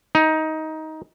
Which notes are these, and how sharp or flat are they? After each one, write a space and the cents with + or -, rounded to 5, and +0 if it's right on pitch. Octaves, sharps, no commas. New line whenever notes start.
D#4 +15